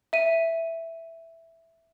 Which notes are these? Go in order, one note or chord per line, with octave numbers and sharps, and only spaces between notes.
E5 D#7